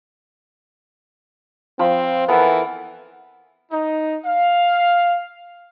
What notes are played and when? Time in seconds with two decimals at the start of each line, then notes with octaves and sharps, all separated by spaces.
1.79 F3 C4 B5
2.28 E3 B3 A4 A#4
3.70 D#4
4.24 F5